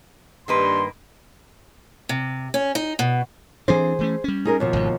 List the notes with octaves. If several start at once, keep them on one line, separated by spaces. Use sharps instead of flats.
G2 D#3 A#3 B4 C6
C3
C#4
D#4
B2
E3 C4 D4 G#4 C5
E3 A3 C#4
G3 C#4
D#4 G#4 A#4
D#2 B2 F3
G#1 G#2